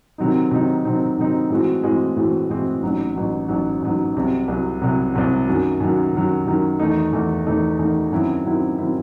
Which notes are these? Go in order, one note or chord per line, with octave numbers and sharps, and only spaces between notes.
C3 D#3 F#3 C4 D#4
C3 D#3 F#3 C4 D#4
C3 D#3 F#3 C4 D#4
C3 D#3 F#3 C4 D#4
A2 E3 G#3 C4 F#4
A2 E3 G#3 C4 F#4
A2 E3 G#3 C4 F#4
A2 E3 G#3 C4 F#4
A1 G#2 F#3
A1 G#2 F#3
A1 G#2 F#3
A1 G#2 F#3
C2 C3 F#3
C2 C3 F#3
C2 C3 F#3
C2 C3 F#3
F#2 D#3 F#3
F#2 D#3 F#3
F#2 D#3 F#3
F#2 D#3 F#3
E2 D#3 A3 D#4
E2 D#3 A3 D#4
E2 D#3 A3 D#4
E2 D#3 A3 D#4
F#2 D#3 F#3 C4 E4
F#2 D#3 F#3 C4 E4
D#3 F#3 C4 E4